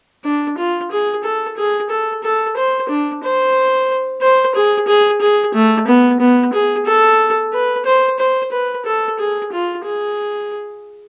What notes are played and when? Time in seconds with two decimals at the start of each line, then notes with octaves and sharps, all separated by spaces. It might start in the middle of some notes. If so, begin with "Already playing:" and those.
0.24 D4
0.58 F4
0.91 G#4
1.24 A4
1.57 G#4
1.90 A4
2.24 A4
2.57 C5
2.89 D4
3.23 C5
4.22 C5
4.55 G#4
4.87 G#4
5.21 G#4
5.55 A3
5.88 B3
6.21 B3
6.53 G#4
6.86 A4
7.53 B4
7.86 C5
8.20 C5
8.52 B4
8.86 A4
9.19 G#4
9.52 F4
9.85 G#4